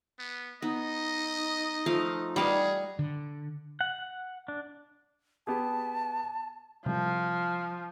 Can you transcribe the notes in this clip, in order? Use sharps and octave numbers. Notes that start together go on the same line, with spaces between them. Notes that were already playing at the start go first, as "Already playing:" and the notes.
B3
B3 D#4 D#5
F3 A3 F5
G3 G#4 D#5 F5 F#5
D3
F#5
D4
B3 G4 G#4 A5
C3 F3 G3